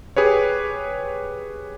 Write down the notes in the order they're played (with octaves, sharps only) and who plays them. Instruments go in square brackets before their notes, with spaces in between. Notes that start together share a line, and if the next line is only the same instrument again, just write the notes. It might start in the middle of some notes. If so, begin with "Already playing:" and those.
[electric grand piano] G4 G#4 B4 C#5